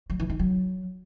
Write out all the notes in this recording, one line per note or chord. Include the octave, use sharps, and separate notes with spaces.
F#3
E3
D#3
F#3